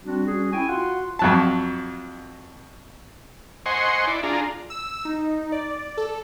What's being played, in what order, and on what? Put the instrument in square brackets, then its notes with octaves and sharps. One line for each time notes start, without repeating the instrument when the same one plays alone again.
[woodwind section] G3 C4 D4 F#4
G3 C#4 F#4 G#4
C#4 E4 G5 G#5
F4 F#4 F#5 C6
[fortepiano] F2 F#3 A5
[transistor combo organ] C5 D#5 F#5 G#5 C6 C#6
E4 D5
D4 F4 G#4 A#5
[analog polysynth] E6
D#4
D5
A4